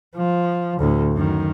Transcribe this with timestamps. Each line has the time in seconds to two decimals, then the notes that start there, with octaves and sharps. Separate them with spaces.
0.16 F3
0.79 D2 A2
1.13 F#2 D#3